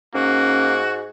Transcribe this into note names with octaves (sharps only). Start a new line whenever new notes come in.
G#2 A#3 C#4 F#4